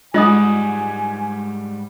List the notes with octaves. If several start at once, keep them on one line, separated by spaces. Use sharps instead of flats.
G#2 G3 G#3 F4 D#5 F#5 G#5 D#6